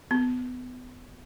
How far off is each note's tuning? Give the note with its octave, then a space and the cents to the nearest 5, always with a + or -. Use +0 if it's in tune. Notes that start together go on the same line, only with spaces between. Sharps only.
B3 +25